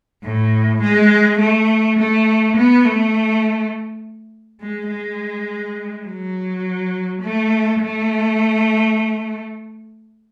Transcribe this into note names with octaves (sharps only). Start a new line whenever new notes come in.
A2
G#3
A3
A3
B3
A3
G#3
G#3
F#3
A3
A3